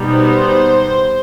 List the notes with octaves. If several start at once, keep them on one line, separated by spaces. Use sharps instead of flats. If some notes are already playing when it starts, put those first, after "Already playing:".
Already playing: B2 G3 B3 D#4
C5